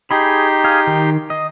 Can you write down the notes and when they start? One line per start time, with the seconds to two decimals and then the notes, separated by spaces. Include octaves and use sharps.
0.11 D#4 G4 G#4 B5 C6
0.64 G#4 F5
0.87 D#3
1.30 D#5